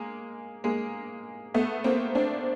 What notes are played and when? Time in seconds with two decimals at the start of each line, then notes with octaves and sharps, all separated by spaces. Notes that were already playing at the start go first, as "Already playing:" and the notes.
Already playing: G#3 A#3
0.64 G#3 A#3
1.54 A3 B3
1.84 A#3 C4
2.15 C4 D4